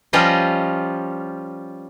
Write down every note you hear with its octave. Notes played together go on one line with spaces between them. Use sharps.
F3 G3 C#4 F4 D#5